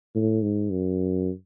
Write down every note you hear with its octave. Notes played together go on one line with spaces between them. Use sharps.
A2
G#2
F#2